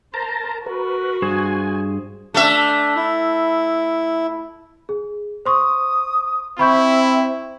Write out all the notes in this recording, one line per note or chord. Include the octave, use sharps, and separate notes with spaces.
A#4 C5 A5 A#5
F#4 A#4 B4
G2 G#4 C5 G#5
A3 D4 E5
E4
G#4
C5 C6 C#6 D#6
C4 E4 E5 B5 C#6 G6